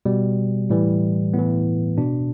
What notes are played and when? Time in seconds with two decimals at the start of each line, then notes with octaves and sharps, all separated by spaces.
0.06 B2 G3
0.70 A2 E3 G3
1.34 A2 E3 B3
1.98 B2 D4